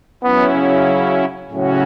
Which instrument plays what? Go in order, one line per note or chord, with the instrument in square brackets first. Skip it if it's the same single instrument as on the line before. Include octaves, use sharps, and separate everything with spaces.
[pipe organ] F#3 C#4 E4 [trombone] B3
[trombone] C#3
[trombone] A2 [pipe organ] C#3 F#3 C#4 F#4